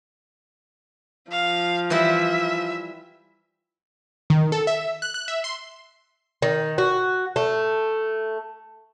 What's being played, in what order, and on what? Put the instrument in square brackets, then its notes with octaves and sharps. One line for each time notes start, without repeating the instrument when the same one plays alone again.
[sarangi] F3 [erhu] F5
[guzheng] E3 G3 E4 [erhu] E5
[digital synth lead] D#3
A4
E5
F#6
F#6
E5
C6
[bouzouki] D#3
F#4
A3